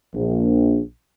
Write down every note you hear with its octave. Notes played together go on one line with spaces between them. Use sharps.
A#1